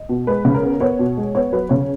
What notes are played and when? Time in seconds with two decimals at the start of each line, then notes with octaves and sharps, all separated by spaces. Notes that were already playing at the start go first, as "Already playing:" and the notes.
Already playing: D#5
0.09 B2
0.27 G#3 B4
0.45 C#3
0.54 A#4
0.63 B3
0.80 B3 C#5
0.99 B2
1.17 G#3
1.35 B3 C#5
1.52 F#3 B4
1.69 C#3 C#5